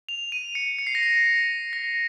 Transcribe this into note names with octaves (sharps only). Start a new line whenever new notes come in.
F7
D#7
C#7
C#7
C7
A#6
C7
A#6